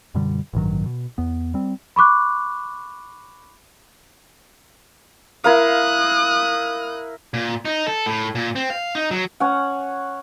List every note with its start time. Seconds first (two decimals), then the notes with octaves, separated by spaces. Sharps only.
0.15 F#2 B2 D3 G3
0.53 A1 G2 D#3 F#3
0.86 B2
1.18 E2 B3
1.54 G3 C4
1.96 B5 C#6 D6 F#6
5.44 E4 A#4 F5 D#6 F#6
7.34 A#2
7.65 D#4
7.87 A4
8.06 A2
8.35 A#2
8.56 C4
8.70 F5
8.95 D#4
9.11 F#3
9.40 C#4 F#5